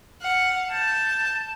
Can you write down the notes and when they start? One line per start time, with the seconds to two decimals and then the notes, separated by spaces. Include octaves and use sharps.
0.22 F5 F#5
0.72 A5 G6